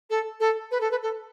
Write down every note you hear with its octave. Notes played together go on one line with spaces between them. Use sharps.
A4
A4
B4
A4
B4
A4